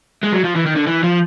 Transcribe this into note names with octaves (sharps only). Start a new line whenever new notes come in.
G#3
F#3
F3
E3
D#3
D3
E3
F3